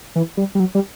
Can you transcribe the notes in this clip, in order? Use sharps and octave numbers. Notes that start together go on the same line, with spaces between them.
E3
G3
G3
F#3
G3